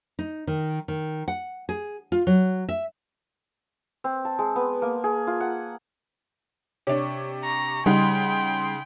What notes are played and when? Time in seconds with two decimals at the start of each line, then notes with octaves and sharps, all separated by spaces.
0.19 D#4
0.47 D#3
0.88 D#3
1.28 F#5
1.69 G#4
2.12 F4
2.27 F#3
2.69 E5
4.04 C4
4.25 A5
4.39 G#3
4.56 B3
4.82 A#3
5.04 G#4
5.27 F4
5.40 F#5
6.87 C3 D4 C#5
7.43 A#5 C#6
7.86 C#3 G3 D#4 F#5 G5 C6